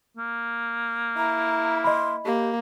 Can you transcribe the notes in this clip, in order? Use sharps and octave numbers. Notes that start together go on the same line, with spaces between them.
A#3
E4 A#5
D#5 B5 C6
A#3 G4